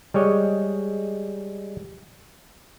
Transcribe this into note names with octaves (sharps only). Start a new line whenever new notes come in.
G3 G#3 C#5 D#5